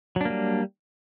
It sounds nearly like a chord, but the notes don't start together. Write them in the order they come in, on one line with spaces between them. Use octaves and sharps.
F#3 D4 A#3 G3